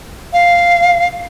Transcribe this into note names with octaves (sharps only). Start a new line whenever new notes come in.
F5